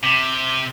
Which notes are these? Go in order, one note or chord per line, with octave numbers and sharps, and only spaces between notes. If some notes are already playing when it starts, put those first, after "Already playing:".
C3